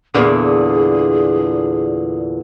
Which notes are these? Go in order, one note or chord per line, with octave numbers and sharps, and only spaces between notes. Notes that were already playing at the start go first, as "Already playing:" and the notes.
E2 A#2 D3 G#4